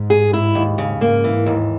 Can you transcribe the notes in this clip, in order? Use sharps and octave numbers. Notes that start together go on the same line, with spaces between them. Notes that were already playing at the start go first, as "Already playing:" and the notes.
Already playing: G#2
G#4
E4
D#2
C#3
G#2 A#3
E3
D#2